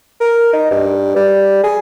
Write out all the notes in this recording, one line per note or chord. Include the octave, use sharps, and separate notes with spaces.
A#4
D#4
G2
G3
G#4